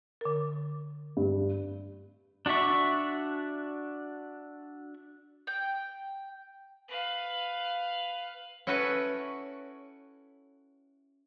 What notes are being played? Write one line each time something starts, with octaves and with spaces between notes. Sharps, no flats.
D3 A#4
G2
D4 F#4 D5 E5 C#6
G5
B4 F5
C#4 E4 F#4 A4 B4 C#5